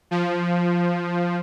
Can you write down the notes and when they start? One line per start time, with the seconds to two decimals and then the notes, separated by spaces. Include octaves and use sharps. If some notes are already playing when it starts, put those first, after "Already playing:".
0.11 F3